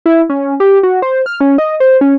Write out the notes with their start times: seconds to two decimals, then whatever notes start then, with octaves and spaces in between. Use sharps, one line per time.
0.06 E4
0.29 C#4
0.60 G4
0.83 F#4
1.02 C5
1.26 F6
1.40 C#4
1.58 D#5
1.80 C5
2.01 C#4